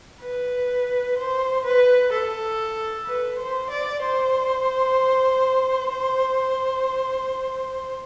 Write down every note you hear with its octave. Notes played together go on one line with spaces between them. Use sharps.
B4
C5
B4
A4
B4
C5
D5
C5
C5